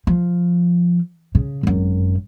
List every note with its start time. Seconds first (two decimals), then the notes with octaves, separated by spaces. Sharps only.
0.07 F3
1.35 C#3
1.63 G#1 F#2